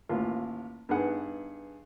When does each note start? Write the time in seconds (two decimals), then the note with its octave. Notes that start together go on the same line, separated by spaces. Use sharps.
0.09 A1 D#2 F4
0.89 G2 B3 D#4 G#4 F#5